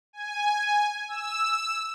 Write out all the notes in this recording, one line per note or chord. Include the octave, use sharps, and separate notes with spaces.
G#5
E6